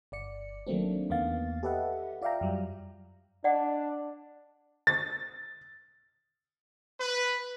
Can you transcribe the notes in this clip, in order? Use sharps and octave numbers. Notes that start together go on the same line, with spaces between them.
G1 D5 C#7
D#3 F#3 A3 A#3 C4 D4
E2 D#3 A#3 B3 F5 A6
G4 A4 B4 D#5 E5 F#5
F4 D5 E5 F5 G5 A#5
F#2 F#3 G3
D4 D5 D#5 F#5
A6
B4